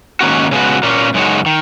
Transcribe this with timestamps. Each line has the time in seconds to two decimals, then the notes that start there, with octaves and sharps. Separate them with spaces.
0.21 G#2 D#3 A#3 C#4 F#4
0.51 C#3 G#3 B3 F#4
0.83 A#2 A#3 C#4
1.14 F#2 C#3 G#3 D#4 F#4
1.46 D#3